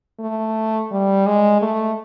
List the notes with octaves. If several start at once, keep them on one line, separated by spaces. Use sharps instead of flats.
A3
G3
G#3
A3